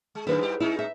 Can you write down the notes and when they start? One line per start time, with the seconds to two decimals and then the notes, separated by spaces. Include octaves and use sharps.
0.15 G#3
0.27 F#2 D#3 E4 B4 C5
0.40 G#2 G3 G4
0.60 G#3 C#4 D#4 E4
0.79 E5